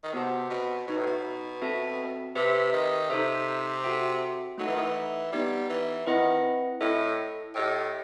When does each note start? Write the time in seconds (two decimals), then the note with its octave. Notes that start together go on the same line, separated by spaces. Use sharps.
0.04 D#3
0.13 C3 B3 F#4 C5 F#5 A5
0.50 B2
0.87 B2 D#4 F#4 B4
0.97 A2
1.06 B2
1.62 C4 F#4 A4 E5 A5
2.35 C3 G4 B4 E5
2.73 D#3
3.10 C3 D#4 A4 C5 E5
3.84 F#4 A4 E5 G5
4.58 F#3 A3 D#4 A4 D#5 F#5
4.67 E3
4.74 D#3
4.82 E3
5.32 G3 B3 D#4 G4
5.69 E3
6.06 D#3 C4 E4 B4 D#5 F#5
6.81 A2 E4 A4 D#5
7.54 A2 G4 D#5 G5